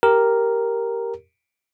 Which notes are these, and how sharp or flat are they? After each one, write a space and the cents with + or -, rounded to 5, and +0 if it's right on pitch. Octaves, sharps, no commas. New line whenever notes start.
G4 +0 A#4 +0